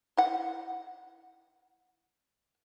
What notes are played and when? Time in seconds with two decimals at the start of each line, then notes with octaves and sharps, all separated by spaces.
0.17 E4 F#5